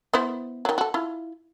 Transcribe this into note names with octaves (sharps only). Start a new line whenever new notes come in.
B3 E4 C5
D#3 F#3
F#4 A4
E4 F4